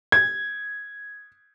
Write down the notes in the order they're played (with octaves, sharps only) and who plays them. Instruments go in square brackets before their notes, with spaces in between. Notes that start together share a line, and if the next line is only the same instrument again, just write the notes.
[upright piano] G#6